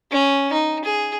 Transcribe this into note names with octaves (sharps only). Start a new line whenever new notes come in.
C#4
D#4
G#4